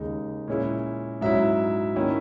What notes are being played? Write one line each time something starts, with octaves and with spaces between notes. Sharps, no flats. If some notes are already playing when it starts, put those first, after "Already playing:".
Already playing: D#2 C#3 G#3 D#4
A#2 G#3 C#4 E4
G#2 F#3 C#4 E4 E5
D#3 A#3 C#4 E4